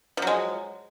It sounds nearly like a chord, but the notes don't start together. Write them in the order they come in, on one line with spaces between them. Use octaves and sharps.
F3 F#3 G#3